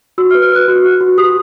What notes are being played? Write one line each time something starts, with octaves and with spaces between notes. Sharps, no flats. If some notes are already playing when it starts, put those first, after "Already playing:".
F#4 E6
F6
B4
F6
B4 F#6
F#4
F#4
F#4
G4 D#6